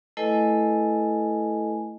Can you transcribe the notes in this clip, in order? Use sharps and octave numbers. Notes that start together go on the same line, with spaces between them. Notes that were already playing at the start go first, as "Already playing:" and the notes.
A3 E4 A4 B4 D#5 G#5